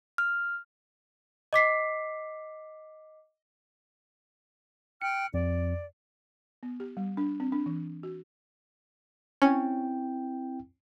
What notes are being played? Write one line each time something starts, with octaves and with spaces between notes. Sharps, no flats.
F6
D#5 D6 B6 C7
G5 F6 F#6 C#7
F2 D5
B3
G4
G3
D4
C4
D4
E3
F#4
C4 C#4 E4 G5